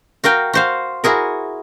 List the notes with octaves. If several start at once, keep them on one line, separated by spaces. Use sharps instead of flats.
F#4 A#4 F5 G5
F#4 C5 F5
E4 F#4 G#4 A#4